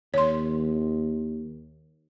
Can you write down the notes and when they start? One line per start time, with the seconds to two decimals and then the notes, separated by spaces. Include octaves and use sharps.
0.14 D#2 C#5 C6